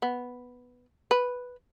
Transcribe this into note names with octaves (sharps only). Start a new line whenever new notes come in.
B3
B4